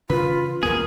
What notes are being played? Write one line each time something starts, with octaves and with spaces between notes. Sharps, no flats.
C#3 E3 F4 B4
A1 D#2 B3 G#4 A#4